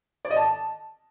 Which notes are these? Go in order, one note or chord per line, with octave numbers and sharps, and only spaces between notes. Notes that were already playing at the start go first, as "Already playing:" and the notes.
D5
D#5
A5